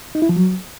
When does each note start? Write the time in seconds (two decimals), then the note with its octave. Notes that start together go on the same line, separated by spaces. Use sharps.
0.15 D#4
0.22 E4
0.29 F3
0.36 F#3